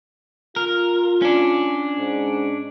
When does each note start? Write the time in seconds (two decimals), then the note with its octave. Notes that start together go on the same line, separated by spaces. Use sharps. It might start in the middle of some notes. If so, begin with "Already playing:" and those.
0.56 F4 A#4
1.22 C#4 D4
1.98 G#2